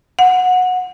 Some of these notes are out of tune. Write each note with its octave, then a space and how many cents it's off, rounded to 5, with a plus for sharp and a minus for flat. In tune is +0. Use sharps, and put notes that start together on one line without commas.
F#5 -15